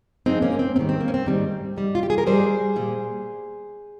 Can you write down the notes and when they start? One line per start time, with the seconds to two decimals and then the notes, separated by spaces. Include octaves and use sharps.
0.26 G2 F3 G#3 C4 D#4
0.42 A#3 C#4
0.59 C4
0.76 G#2 D#3 G3 C4
0.89 C4
1.01 A#3
1.08 C#4
1.14 C4
1.26 G#2 D#3 G3
1.76 G#2 G3
1.95 F4
2.03 G4
2.10 G#4
2.18 A#4
2.26 G#2 G3 G#4 C5
2.76 A#2 G3